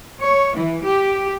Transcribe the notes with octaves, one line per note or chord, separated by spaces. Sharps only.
C#5
E3
G4